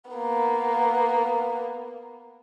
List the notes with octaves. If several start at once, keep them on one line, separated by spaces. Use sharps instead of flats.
A#3 B3